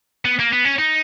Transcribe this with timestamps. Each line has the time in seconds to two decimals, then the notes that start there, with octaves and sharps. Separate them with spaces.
0.25 B3
0.39 A#3
0.52 B3
0.65 C#4
0.78 D#4